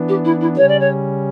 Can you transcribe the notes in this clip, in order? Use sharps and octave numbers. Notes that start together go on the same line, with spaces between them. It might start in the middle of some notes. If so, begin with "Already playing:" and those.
Already playing: E3 B3 D4
G4
E4
E4
C#3 G3 C#4 C#5
D5
C#5